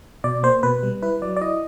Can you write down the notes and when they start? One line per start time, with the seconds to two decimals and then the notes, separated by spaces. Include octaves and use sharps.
0.24 B2 D5
0.43 A#3 C5
0.63 B2 B4
0.83 G3
1.03 E4 B4
1.22 F#3 D5
1.37 D5
1.41 E4 D#5